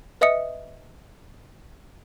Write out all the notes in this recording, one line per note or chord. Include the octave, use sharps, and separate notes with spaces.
B4 D#5 E5 D#6 C#7